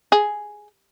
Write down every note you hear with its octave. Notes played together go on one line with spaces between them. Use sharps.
G#4